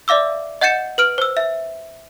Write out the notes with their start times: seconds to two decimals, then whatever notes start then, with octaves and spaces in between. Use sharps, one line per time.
0.08 D5 E5 F5 D6 E6
0.61 D#5 F#5 G6 A6 C#7 E7
0.98 B4 F6 D7
1.18 C5 E6
1.37 E5